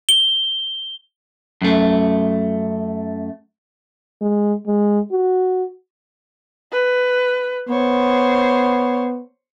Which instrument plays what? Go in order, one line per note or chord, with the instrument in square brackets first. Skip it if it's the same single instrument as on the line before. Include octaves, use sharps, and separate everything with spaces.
[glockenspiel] G7
[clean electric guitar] F#2 A3
[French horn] G#3
G#3
F#4
[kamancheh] B4
[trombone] B3 [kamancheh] C5 C#5